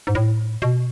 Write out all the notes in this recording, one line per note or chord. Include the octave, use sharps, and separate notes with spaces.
G#2
A2
B2